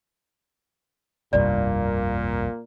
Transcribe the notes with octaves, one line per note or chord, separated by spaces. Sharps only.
F1 C2 G2 A#2 A#3 D5